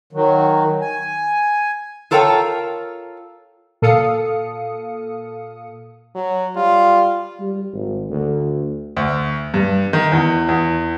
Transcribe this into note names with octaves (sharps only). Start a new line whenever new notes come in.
D#3 F#3
G#5
F4 A4 A#4 C#5 G5
A#2 A4 F5 D#6 C#7
F#3
G3 F4
G3
G#1
D2
D2
G2
D#3
E2
E2